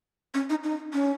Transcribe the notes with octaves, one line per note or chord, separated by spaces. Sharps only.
C#4
D#4
D#4
C#4